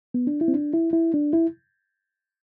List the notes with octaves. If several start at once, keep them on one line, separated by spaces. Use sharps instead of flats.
B3
D4
E4
C4
D4
E4
E4
D4
E4